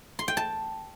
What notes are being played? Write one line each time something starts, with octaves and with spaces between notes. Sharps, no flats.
C6
G5
A5